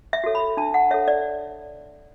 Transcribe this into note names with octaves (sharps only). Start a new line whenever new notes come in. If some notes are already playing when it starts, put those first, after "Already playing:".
E5
F#4 A4 C#5
B5
D4 A5
F#5
A4 C#5 E5
D5